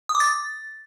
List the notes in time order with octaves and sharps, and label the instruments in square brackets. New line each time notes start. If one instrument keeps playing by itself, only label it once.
[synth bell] D#6
D6
A6